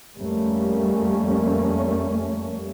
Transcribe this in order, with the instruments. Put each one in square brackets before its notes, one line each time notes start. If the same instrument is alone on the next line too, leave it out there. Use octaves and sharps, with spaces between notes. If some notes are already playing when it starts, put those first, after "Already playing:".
[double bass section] F2 G3 A3 A#3 C#4